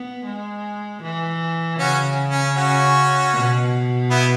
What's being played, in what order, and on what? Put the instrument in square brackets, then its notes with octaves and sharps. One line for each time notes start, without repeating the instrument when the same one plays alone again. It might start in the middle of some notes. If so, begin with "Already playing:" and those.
Already playing: [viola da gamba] B3
G#3
E3
[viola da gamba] C#3 [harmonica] C#4 F#4
[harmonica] C#4
C#4 F#4
[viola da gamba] B2
[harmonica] B3 E4